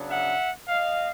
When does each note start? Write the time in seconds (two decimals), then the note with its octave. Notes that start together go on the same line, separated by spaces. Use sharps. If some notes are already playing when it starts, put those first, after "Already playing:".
Already playing: C#3 F#3 B3 D4
0.10 E5 F#5
0.68 D#5 F5